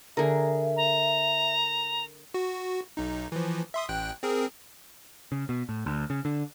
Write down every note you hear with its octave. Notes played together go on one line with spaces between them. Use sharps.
D3 G#4 A#4 E5
A#5
F#4
B1 D#4
E3 F3
E5 C6 D#6
A1 G5 F#6
C4 G#4 A#4
C#3
B2
A2
D2
C#3
D3